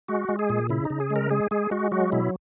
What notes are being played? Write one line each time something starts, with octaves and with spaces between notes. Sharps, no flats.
G#3 F#4
G#3
G#4
A#2
C#3 E4
C#3 D#4
G#4
G#3
A#4
G#3 G#4
G#3 G#4
G#3 F#4
F#3 F#4
B2 E4